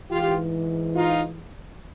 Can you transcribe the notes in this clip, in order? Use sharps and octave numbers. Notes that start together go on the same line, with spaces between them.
G#2 E3 F4 G4
D#4 F4